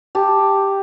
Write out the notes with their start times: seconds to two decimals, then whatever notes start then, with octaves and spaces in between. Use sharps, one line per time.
0.15 G4 A5